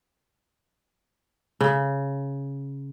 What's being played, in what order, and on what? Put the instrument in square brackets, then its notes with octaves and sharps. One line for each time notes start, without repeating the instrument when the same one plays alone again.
[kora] C#3